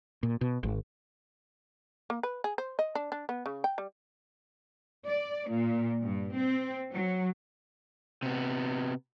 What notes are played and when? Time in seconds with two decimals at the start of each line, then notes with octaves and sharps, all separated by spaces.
0.23 A#2
0.41 B2
0.63 G#1
2.10 A#3
2.23 B4
2.44 G#4
2.58 C5
2.79 D#5
2.95 D4
3.12 D4
3.29 B3
3.46 C#3
3.64 G5
3.78 G3
5.06 D5
5.49 A#2
6.02 G2
6.34 C4
6.92 F#3
8.23 C3 B3